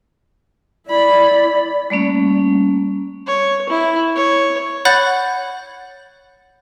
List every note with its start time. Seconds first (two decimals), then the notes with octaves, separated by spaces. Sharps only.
0.88 E4 D5 B5
1.90 G3 A3 A#3 C#4
3.27 C#5
3.69 E4
4.16 C#5
4.85 C#5 F#5 B5 F#6 G6 A6